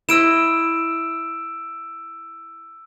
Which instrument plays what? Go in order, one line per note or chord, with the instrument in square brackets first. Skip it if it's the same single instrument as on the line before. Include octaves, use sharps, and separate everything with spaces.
[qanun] E4 C5 D#5 [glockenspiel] E6 D7 E7